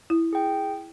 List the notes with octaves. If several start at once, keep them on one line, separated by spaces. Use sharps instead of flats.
E4
G#4 G5